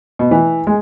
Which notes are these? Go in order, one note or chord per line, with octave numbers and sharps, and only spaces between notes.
B2
E3
G#3